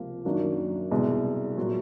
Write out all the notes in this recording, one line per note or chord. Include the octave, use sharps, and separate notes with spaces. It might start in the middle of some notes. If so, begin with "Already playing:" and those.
Already playing: C#2 C3 F3 A#3
F#2 D#3 F#3 A#3 D4
C2 B2 G#3
A#2 F#3